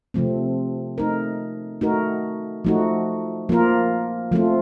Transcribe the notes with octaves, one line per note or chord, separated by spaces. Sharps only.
C3 F3 A3 C4
A3 D#4 A#4
A3 D#4 F#4 A#4
F3 A3 D#4 F#4
F3 A#3 F4 A#4
F3 A3 C4 F4